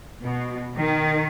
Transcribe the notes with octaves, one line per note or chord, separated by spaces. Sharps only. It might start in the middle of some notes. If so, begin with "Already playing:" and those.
B2
D#3